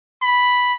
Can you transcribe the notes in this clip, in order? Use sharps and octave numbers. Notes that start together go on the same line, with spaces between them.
B5